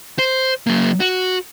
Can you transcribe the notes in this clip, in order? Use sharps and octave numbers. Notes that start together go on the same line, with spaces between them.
C5
F#3 A#3
F#4